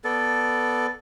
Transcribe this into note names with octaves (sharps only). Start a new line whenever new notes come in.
B3 A4 D5